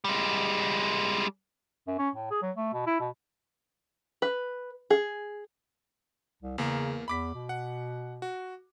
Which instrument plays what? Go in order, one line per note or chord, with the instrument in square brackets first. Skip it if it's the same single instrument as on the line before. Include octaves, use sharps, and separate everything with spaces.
[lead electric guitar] G3 G#3
[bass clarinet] F#2
C#4
A2
G#4
F#3
A3
B2
E4
B2
[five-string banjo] B4
G#4
[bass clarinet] C2
[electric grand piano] E2 A#3 A#4 [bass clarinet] C#3
[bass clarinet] E2 [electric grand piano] B5 D6 B6
[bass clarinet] B2
[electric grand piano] F#5
F#4